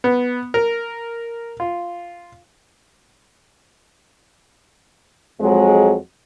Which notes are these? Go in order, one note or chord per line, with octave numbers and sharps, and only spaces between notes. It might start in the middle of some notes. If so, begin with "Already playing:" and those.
B3
A#4
F4
F2 F#3 G#3